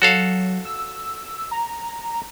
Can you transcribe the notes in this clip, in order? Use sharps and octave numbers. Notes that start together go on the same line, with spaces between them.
F#3 F#4 A4 F5
E6
A#5